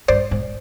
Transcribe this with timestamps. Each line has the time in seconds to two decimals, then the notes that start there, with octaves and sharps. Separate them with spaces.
0.08 G2 C5 D5
0.31 G#2